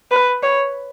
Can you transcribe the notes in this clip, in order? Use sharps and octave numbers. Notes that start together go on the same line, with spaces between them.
B4
C#5